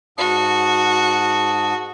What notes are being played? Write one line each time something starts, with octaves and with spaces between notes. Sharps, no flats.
G#2 F#4 A5 D#6